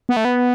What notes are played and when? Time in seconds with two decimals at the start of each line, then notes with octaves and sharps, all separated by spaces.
0.09 B3
0.17 A3
0.25 B3